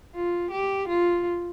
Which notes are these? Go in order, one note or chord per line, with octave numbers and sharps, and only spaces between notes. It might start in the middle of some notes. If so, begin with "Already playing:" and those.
F4
G4
F4